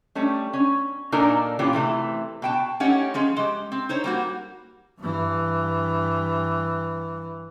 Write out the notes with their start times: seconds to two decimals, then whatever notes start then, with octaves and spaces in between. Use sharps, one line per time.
0.15 G3 A3 C#4
0.53 C#4
1.12 A#2 D4 D#4 A4 A#4 G#5
1.59 A#2 E3 C#4 F4 G4
1.73 C3 E3 A3
2.42 B2 G5 A5
2.80 A3 C#4 D#4 G4 C#5 F#5
3.14 F3 G#3 C#4
3.37 G#3 G4
3.72 C4
3.89 D#4 C5 C#5
4.04 G3 A#3 F#4
4.99 G2 E3